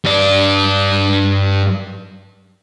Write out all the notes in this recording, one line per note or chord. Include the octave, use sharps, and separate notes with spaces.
G2 D5